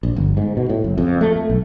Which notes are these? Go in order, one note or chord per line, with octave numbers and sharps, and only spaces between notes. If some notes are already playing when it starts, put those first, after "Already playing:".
A#1
G1
G#2
B2
A2
F#1
F2
A3
A3
B1